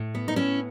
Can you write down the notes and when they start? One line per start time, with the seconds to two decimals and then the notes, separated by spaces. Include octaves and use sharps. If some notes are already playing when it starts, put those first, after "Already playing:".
Already playing: A2
0.15 B3
0.28 D#4
0.36 A2 C#4 E4